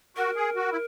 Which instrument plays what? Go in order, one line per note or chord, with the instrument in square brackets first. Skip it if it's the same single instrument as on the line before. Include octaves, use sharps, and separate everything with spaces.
[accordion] F#4 [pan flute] A#4
[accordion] G#4
F#4
E4